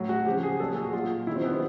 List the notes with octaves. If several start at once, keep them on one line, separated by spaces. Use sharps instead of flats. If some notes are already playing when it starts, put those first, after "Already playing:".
Already playing: A2 F#3
F#4
C#3 F3 G4
G#4
A#2 F#3 A4
G#4
F#4
A#2 F#3 F4
C3 D#3 F#3 E4
C4
B3
C4